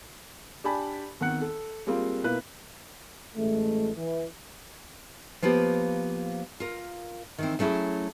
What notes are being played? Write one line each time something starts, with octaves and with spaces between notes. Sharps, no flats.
D4 G4 D5 G#5 A5 B5
E2 D#3 C4 F#5 F#6 C#7
A4
G3 G#3 A#3 C4 F4
B2 A#3 E4 B4 F#6
A1 G#3 A3
E3
F3 A#3 B3 F4 G4
F4 A#4
D#3 E3 C4
F#3 A3 C#4 E4 G#4